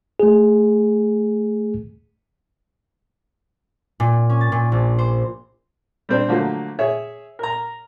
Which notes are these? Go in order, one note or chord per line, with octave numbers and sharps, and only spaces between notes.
A3 G#4
A#2
C#4
A6
A#2
A#1
C5
G3 C4 D4
D3 F3 F#3 A3 A#3
G#4 C#5 E5
A#4 A#5